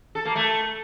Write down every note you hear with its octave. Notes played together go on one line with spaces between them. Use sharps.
A4
A#3
A3